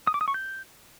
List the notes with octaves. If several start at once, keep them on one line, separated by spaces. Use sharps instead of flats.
D#6
D6
D#6
C#6
G6